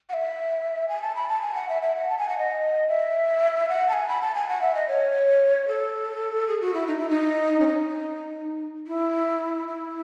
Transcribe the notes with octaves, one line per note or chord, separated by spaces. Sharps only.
F#5
E5
G#5
A5
B5
A5
G#5
F#5
E5
E5
F#5
A5
G#5
F#5
D#5
E5
F#5
A5
G#5
B5
A5
G#5
F#5
E5
D#5
C#5
A4
G#4
F#4
E4
D#4
E4
D#4
C#4
D#4
E4
E4